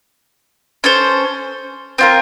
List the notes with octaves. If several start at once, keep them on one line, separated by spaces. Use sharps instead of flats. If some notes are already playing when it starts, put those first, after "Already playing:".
C#4 A4 C5
C4 F4 A#4